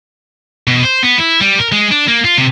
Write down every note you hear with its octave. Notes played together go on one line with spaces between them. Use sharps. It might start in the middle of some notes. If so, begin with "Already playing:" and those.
B2
C5
B3
E4
G3
A#4
G#3
D4
A#3
F4
C3